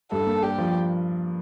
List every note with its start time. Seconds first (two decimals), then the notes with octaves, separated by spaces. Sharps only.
0.11 G2 A4
0.27 A#3
0.43 D4 G4
0.58 F3